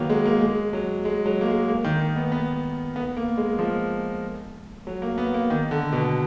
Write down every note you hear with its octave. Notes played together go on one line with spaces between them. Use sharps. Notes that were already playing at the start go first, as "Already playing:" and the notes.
Already playing: D#3 F#3 A#3 B3
G#3
A#3
G#3
F#3
G#3
F#3
A#3
G#3
A#3
D#3
D#3
B3
B3
B3
A#3
G#3
F3
F#3
A#3
B3
A#3
D#3
D3
B2